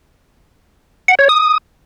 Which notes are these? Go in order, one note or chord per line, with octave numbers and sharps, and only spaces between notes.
F#5
C#5
D#6